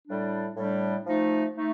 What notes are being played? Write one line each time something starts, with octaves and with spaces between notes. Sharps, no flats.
A2 G3 D4
A2 G3 D4
F3 A3 D#4
A3 D#4